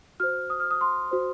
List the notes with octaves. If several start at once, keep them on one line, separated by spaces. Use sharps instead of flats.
F#4 C5 F6
D#6
F6
D#6
C6
F#4 C5